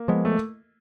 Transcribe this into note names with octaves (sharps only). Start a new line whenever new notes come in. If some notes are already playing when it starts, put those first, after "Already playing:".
Already playing: A#3
F3 G#3 B3
A3